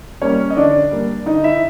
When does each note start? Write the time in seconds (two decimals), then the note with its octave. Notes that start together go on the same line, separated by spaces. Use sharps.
0.22 G3 A#3 C#4 C#5
0.50 D#5
0.57 D3 D4 D5
0.91 G3 A#3
1.26 D3 D#4 D#5
1.44 E4 E5